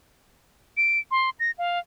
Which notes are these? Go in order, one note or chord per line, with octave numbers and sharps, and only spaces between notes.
D7
C6
A#6
F5